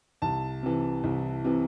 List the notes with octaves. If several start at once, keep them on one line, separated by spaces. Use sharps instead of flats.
C2 A5
C3 E3
C2
C3 E3